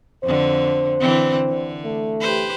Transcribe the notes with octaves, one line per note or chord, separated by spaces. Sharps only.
F2 D3 C5
D3 E3 C4
D3
A3
G4 B4 C5